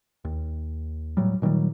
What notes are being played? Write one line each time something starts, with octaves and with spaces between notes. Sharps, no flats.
D#2
A2 F#3 G3
A#2 D#3 F#3 G3